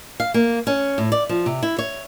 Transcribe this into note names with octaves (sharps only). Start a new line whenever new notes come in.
F5
A#3
C#4
A2
D5
F3
C3
E4
C#5